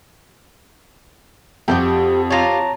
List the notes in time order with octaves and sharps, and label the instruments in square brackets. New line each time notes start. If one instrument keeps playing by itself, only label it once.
[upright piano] F2 [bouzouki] F#4 G4 G5
[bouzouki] F4 G4 [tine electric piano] C#5 A5 A#5